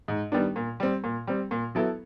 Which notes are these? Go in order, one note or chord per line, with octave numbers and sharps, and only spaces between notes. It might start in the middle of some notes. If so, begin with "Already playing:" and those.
G#2
D#3 G3 B3 D4
A#2
G3 C4
A#2
G3 C4
A#2
F#3 B3 E4 A4